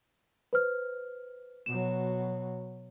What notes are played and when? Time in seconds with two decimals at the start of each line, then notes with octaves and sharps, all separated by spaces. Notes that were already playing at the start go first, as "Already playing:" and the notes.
0.53 B4 C5 F6
1.66 B2 F#3 E7